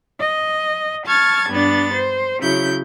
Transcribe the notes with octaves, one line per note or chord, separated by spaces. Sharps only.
D#5
A5 C#6 F6 G#6 A6
G2 B3 D4 A6
C5
C#3 F#3 E4 G6